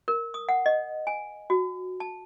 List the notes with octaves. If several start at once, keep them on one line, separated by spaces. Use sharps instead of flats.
A#4
D#6
F#5
D#5
G#5
F#4
A5